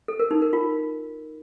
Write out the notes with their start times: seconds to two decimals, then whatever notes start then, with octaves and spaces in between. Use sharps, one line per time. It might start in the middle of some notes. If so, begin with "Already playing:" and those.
0.08 A4
0.20 A#4
0.31 D#4
0.42 A#4
0.53 F4